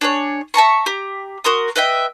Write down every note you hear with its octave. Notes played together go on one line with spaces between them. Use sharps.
D4 G#4 B4 C#5
E5 A5 A#5 C#6
G4 A#5
F#4 A#4 C6 D#6
B4 D#5 E5 G5